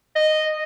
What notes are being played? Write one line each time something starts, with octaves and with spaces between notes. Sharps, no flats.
D#5